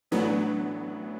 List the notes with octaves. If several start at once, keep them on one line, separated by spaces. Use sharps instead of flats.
A2 E3 F#3 A3 B3 D4